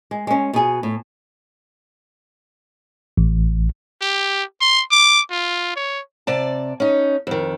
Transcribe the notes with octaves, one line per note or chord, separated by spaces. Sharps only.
G#3
G#3 C#4
B2 G#4
A2
A1
G4
C6
D6
F4
C#5
C3 D5 A5
C#4 D#4
F2 D#3